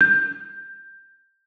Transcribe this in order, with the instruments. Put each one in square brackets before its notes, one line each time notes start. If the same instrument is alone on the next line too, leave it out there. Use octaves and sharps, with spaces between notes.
[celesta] G6